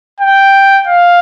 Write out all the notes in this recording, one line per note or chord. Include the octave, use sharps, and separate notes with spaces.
G5
F5